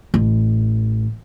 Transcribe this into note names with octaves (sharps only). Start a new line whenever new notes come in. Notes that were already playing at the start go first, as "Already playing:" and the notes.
A1